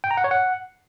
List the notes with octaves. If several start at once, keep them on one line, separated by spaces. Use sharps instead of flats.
G5
A#5
F#5
C#5
F#5